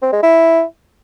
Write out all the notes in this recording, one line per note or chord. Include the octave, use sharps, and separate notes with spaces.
C4
G#3
E4